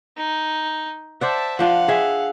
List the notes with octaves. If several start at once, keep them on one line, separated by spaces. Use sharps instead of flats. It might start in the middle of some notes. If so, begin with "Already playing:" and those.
D#4
C5 D5 E5 F#5 A5
F3 D4 F4 F5 F#5
G#4 E5